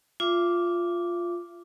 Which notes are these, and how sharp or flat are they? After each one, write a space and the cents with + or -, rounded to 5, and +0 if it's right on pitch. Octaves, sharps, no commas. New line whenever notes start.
F4 +0 E5 +40 D6 -5